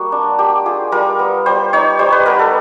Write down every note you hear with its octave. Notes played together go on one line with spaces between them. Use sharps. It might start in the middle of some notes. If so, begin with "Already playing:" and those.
Already playing: G3 A#3 F#4
D4
A#3 G4
F4 G#4
G3 A#4
B3
G3 C5
D#4 C#5
G3 C5
B4
B3 A#4
A4